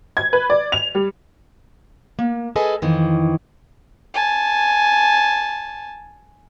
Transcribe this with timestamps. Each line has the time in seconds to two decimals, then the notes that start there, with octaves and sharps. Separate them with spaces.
0.17 G#6
0.33 B4
0.50 D5
0.72 F7
0.95 G3
2.19 A#3
2.56 G#4 A4 B4 D#5 G#5
2.82 F2 D#3 E3
4.14 G#5 A5